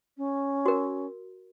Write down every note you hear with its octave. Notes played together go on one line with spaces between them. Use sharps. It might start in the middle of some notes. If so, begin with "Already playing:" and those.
C#4
F#4 A#4